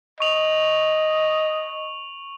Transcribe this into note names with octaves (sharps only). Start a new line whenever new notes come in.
D#5 C#6 F7 F#7